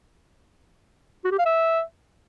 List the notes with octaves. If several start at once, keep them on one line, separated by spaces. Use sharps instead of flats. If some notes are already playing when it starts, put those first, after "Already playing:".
F#4
G4
F5
E5